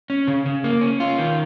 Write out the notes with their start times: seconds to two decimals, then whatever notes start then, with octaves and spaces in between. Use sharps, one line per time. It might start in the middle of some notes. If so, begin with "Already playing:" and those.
0.10 C#4
0.28 C#3
0.46 C#3
0.64 A#3
0.81 C#4
1.00 F4
1.18 D#3